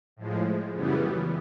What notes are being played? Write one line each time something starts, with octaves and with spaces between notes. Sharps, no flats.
A2 F3 G#3
F#2 C#3 E3 G3 B3